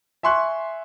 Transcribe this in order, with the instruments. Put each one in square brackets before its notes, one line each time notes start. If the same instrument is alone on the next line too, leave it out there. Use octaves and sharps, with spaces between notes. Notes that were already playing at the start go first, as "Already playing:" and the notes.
[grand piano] E5 G#5 C6 C#6 F#6